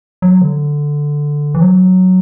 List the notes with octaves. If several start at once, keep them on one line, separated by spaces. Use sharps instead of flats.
F#3
D3
E3
F#3